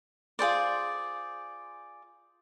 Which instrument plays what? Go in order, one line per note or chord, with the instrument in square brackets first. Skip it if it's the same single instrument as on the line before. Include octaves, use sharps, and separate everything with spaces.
[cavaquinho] F4 G#4 C5 D5